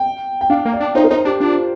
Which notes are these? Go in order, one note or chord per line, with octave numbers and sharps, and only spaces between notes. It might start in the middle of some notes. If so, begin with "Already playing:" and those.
Already playing: G5
G5
D4 F5
A#3
D5
D4
D#4 C5
A#4
D#4 C5
D4 G4
D4 F4